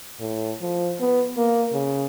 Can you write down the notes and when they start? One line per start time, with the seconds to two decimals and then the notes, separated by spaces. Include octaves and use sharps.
0.20 A2
0.61 F3
1.00 B3
1.37 A#3
1.73 C#3